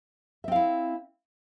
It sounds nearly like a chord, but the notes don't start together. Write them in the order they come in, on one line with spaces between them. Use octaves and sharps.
E5 C4 F5 E4